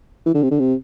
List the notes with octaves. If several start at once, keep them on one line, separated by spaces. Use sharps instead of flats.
E3
D3
C3
D3
C3